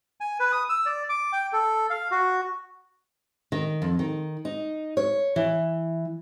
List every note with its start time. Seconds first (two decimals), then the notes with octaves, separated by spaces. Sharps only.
0.20 G#5
0.40 B4
0.52 D#6
0.69 E6
0.86 D5
1.09 D6
1.33 G5
1.53 A4
1.90 F5
2.11 F#4
3.52 D#3
3.82 F2
3.99 D#3
4.45 D#4
4.97 C#5
5.36 E3